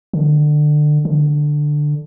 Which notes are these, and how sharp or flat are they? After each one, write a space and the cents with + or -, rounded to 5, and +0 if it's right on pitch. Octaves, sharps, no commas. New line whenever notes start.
D3 +25
D3 +10